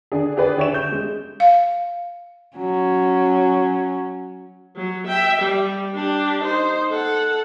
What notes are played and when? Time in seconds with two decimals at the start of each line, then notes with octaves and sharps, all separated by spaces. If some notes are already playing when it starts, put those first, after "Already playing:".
0.12 D3 D4 G#4
0.37 G4 G#4 B4 D5
0.57 D3 G4 C#5 E5 C#6 E7
0.74 G6
0.92 G#3
1.40 F5
2.57 F#3 C#4
4.76 F#3
5.07 E5 G5
5.42 G3
5.94 D4 G4
6.41 D#4 C5
6.91 A4 F#5